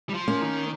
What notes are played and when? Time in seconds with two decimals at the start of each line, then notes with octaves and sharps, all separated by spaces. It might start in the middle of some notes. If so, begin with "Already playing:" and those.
0.09 G3
0.14 F3
0.28 A#3 C#4
0.41 D#3